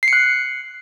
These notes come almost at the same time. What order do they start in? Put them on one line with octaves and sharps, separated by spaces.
C7 C#7 F#6